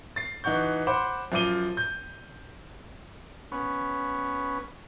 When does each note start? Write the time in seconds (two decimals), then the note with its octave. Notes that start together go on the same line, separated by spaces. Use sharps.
0.16 A6 C7
0.44 E3 D#4 F#4 C#6 G6
0.87 C5 F#5 B5 C6 D6
1.32 F#2 F3 F5 D6 D#7 G7
1.77 G6
3.52 B3 C#4